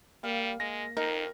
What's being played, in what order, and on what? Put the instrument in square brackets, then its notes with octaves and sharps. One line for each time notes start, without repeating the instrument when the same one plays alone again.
[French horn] G3 [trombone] A#3 [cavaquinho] F5
[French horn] G#3 [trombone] A#3 [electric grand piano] A#6
[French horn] F2 [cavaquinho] D#4 [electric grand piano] A#4